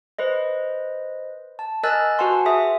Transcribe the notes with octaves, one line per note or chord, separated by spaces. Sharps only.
B4 C5 D#5
A5
A#4 D#5 G#5 E6 F#6 A6
F#4 B4 F#5 G#5 A5 C6
G#4 E5 D#6